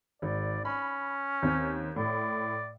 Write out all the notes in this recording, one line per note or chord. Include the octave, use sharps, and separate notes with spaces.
G#1 D5
C#4 B5
D#2 C4
A2 D5